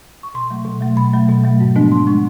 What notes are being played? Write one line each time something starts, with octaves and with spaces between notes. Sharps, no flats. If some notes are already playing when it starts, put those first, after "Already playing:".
C#6
B2 C6
F#3 A3
B2
F#3 A3
B2 B5
F#3 A3
B2
F#3 A3
G#2
F3 G#3 B3 D4
G#2 C6
F3 G#3 B3 D4 C#6